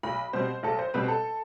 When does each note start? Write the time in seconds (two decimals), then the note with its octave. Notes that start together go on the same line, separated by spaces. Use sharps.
0.03 B1 B5
0.33 B2 G3 C4 C5
0.63 B1 A4
0.79 C5
0.94 B2 G3 C4 B4
1.08 A4